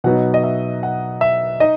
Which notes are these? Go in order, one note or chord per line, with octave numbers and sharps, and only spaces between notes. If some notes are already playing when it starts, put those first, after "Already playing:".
B2 F#3 B3 D#4 F#5
D#5
E5
F#5
E5
D#4 D#5